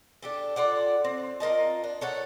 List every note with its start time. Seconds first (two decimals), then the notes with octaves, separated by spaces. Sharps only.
0.23 D4 G4 A4
0.56 F4 A4 D5 F#5
1.04 C4
1.40 F4 A#4 D#5 A5
1.84 D4
2.01 A4 C#5 F#5